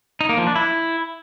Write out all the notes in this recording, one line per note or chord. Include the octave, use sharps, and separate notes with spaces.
D#4
A#3
F3
D4
E4